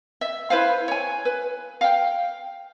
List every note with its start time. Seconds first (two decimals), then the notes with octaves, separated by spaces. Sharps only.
0.21 E5
0.50 E4 B4 C5 F5
0.88 C#5 G#5
1.25 B4
1.81 F5 G5